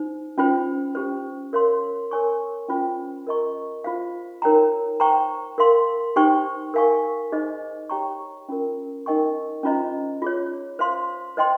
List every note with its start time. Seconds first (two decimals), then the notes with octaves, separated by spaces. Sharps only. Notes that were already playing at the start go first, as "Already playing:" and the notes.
Already playing: D#4 C5
0.38 C#4 F4 C5 G5
0.95 C#4 G4 C5
1.53 A#4 C#5 F5 C6
2.11 A#4 C#5 G#5 C#6
2.68 C#4 F4 C5 G5
3.27 A#4 D#5 A#5 C#6
3.84 F4 C5 F5
4.42 D#4 A#4 C#5 G5 A#5
5.00 C5 G5 A#5 C#6
5.58 A#4 F5 C6
6.16 D#4 G4 C5 G5 C#6
6.74 A#4 F5 G#5 C#6
7.32 D#4 G#4 C5 D#5
7.90 G4 C#5 G5 A#5 C#6
8.49 C#4 F4 A#4
9.06 D#4 A#4 D#5 G5 C#6
9.63 C#4 F4 C5 D#5 A#5
10.22 F4 G#4 C#5
10.79 C5 F5 C6
11.37 C5 D#5 G5 C6